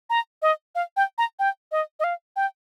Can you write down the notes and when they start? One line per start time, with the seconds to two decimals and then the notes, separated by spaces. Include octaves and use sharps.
0.10 A#5
0.42 D#5
0.75 F5
0.97 G5
1.18 A#5
1.39 G5
1.72 D#5
2.00 D#5
2.04 F5
2.36 G5